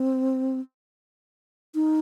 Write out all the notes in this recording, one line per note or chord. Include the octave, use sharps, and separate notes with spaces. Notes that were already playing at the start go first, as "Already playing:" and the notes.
Already playing: C4
D#4